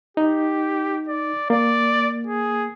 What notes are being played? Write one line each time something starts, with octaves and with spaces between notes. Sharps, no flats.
D#4 G4
D5
A#3 D5
G#4